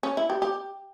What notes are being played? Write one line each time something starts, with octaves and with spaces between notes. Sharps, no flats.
C#4
E4
G4
G4